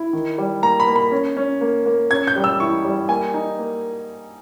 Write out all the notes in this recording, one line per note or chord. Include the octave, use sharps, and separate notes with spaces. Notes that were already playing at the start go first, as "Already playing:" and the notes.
Already playing: E4
D#3
G3
A#3 A#5
B5
A#3
B5
C#4
C#4
A#3
A#3
C#4 G#6
G6
G3
E6
E4 C#6
G3
A#3 G#5
D#4
A#3